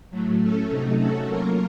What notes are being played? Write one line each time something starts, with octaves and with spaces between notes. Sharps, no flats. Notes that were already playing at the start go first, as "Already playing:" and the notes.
A2 F#3 A3
A3 C#4 A4
C3 F#3 A3 D#4
A3 C#4 F#4 A4
F#3 A#3 F4 A#4